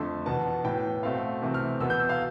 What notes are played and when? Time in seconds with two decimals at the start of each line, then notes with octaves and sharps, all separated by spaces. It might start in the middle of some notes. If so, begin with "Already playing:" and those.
Already playing: F2 D3 A3 C6
0.26 E2 B2 B3 A5
0.64 A2 E3 B3 G5
1.03 B2 A3 C4 F5
1.42 C3 E3 A3 C4
1.54 F6
1.80 E2 B2 B3 E6
1.90 G6
2.00 E6
2.09 F5